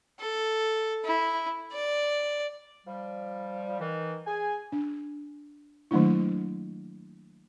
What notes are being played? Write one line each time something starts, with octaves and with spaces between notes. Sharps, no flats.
A4
E4
D5
F3 G3
D#3 E3
G#4 G#5
D4
D#3 F#3 A3 A#3 D4 E4